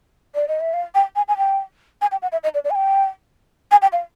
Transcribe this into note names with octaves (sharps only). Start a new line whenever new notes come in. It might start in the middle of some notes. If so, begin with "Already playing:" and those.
D5
D#5
E5
F5
G5
G#5
G#5
G5
G#5
G5
F#5
E5
D#5
D5
D5
G#5
G5
G#5
G5
F5